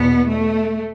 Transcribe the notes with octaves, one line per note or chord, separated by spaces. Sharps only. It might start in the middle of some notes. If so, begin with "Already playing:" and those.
Already playing: E2 B2 B3
A3